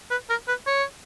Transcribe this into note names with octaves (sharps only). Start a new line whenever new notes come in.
B4
A#4
B4
C#5